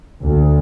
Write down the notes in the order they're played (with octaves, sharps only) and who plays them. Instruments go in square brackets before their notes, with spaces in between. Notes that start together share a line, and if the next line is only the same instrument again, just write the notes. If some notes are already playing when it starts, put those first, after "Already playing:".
[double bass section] D2